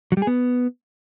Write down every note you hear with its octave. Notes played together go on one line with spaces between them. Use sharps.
F#3
G3
G#4
B3